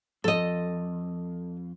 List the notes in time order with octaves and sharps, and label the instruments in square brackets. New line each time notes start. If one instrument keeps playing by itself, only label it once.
[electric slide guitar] F2 [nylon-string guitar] A4 D#5